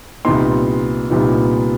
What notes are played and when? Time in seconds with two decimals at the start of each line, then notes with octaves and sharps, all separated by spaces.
0.25 C2 A#2 G3 B3 D#4 C6
1.10 C2 A#2 G3 B3 D#4